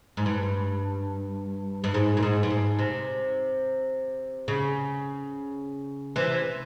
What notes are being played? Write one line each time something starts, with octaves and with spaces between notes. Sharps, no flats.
G#2
G2
G2
G#2
A#2
G#2
G2
G#2
C3
C#3
C3 E3